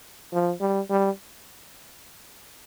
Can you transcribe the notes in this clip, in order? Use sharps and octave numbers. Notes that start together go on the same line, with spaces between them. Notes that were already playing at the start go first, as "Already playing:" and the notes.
F3
G3
G3